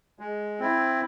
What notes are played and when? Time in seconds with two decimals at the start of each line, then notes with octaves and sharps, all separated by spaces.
0.19 G#3
0.59 C4 E4